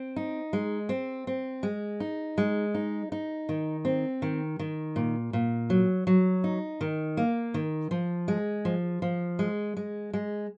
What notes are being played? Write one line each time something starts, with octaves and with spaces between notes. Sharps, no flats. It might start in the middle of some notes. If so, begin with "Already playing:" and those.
Already playing: C4
D#4
G#3
C4
C4
G#3
D#4
G#3
D#4
D#4
D#3
C4
D#3
D#3
A#2
A#2
F#3
F#3
D#4
D#3
A#3
D#3
F3
G#3
F3
F3
G#3
G#3
G#3